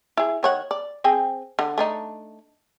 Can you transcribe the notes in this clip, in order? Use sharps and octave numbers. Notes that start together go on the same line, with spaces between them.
E4 G#4
D#3 C#5 F#5
D5
C4 G#4 G5
D3
A3 D4 D#4